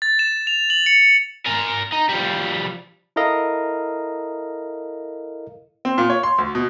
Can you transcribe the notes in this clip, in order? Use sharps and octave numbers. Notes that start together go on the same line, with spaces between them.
A6
E7
F7
F#7
C#7
C#7
A#4 G#5
D#4
F3 G3
E4 A4 A#4 D#5 F5
C4
A#2
C#5
C6
D2
B2